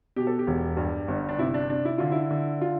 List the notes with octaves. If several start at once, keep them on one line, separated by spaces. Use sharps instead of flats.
B2 G4
A4
G4
E1
G2
G1
D4
C3 E4
D4
C3 D4
E4
D3 F4
E4
D3
F4